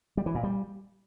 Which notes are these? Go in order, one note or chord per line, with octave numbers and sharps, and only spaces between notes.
G3
E3
A#2
G3